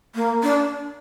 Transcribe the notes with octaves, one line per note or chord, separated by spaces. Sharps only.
A#3
D4